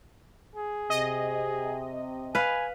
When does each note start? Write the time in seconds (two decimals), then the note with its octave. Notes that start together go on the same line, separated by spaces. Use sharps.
0.56 G#4
0.90 C3 D#5
2.35 B4 F5 G#5